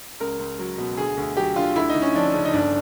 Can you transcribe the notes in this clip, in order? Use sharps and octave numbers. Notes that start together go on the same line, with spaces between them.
C#2 A#4
C#2
F#3
B2
D2 G#4
D2
F#3 G4
D3 F4
D2 E4
D#4
D2
C#4
F3 D4
C#3
D#4
G1 D4